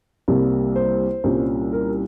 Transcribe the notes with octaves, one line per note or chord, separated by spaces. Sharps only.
C2 C3 G3 A#3
C5
C2 A#2 G3 C#4
A#4